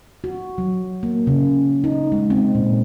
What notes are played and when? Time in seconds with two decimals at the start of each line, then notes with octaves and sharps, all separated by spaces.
0.24 F#4
0.58 F#3
1.03 A#3
1.27 C#3
1.84 D#4
2.12 G#3
2.30 C4
2.55 A#2